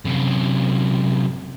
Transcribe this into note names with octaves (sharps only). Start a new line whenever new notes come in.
F#2 C3